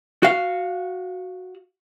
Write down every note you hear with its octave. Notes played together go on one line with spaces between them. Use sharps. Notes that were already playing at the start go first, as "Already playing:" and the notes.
F#4 F5